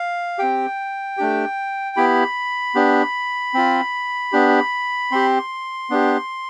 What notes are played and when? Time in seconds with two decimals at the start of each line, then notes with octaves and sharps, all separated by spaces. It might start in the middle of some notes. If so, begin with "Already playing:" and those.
Already playing: F5
0.38 C4 G4 G5
1.17 A3 D4 G4
1.96 B3 E4 G4 B5
2.75 B3 D4 G4
3.54 C4 F4
4.32 B3 D4 G4
5.11 C4 G4 C6
5.90 B3 D4 G4